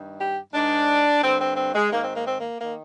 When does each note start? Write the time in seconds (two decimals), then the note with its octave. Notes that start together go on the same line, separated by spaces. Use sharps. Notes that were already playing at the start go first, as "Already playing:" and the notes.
Already playing: G2 D#3
0.19 G4
0.53 G#2 D#3 D4
1.22 G2 D3 C4
1.39 C4
1.56 C4
1.74 G#3
1.91 G#2 D#3 A#3
2.02 C4
2.14 A#3
2.26 C4
2.39 A#3
2.60 D#3 A#3